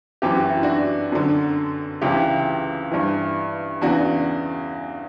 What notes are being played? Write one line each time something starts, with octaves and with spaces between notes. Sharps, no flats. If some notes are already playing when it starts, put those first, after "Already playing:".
F#2 E3 G4
F#4
E4
D4 F#4
F#2 D3
C#2 C#3 E3 E4 G4
G2 E3
E2 C#3 E3 D4 F#4